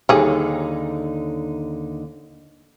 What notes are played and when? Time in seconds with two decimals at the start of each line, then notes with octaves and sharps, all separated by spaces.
0.09 D#2 D3 G3 D#4 G#4